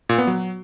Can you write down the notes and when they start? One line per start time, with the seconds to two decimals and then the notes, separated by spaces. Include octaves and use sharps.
0.09 A#2
0.18 B3
0.27 F#3